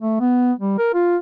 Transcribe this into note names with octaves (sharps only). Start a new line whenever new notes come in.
A3
B3
G3
A#4
F4